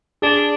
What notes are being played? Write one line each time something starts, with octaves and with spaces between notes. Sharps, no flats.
D4 G#4